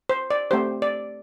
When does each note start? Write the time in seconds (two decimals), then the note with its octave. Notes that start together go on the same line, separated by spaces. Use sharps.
0.09 C5
0.31 D5
0.51 A3 C4 G4 C5
0.82 D5